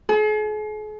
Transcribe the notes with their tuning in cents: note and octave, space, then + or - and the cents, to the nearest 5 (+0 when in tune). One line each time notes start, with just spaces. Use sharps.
G#4 +45